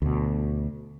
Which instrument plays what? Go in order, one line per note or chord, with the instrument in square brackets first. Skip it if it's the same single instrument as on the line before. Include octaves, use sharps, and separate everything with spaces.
[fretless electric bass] D2 B2